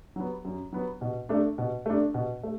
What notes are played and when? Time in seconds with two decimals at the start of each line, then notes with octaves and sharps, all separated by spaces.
0.16 F#3 B3
0.45 F#2
0.73 F#3 B3
1.01 B2
1.29 A3 D4
1.58 B2
1.86 A3 D4
2.14 B2
2.43 A3